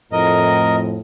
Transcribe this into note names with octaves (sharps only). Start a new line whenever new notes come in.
F2 A2 A#4 D#5